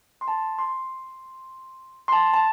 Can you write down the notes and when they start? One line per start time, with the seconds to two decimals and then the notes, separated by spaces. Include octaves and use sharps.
0.21 C6
0.28 A5
0.59 C6
2.08 C6
2.12 A5
2.34 A5